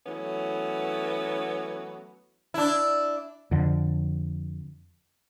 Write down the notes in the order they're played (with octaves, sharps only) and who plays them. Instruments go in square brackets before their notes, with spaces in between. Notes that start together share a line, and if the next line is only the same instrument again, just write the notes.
[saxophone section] E3 F#3 A3 B3 C#4
[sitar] D4 E4
[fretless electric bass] F2 D3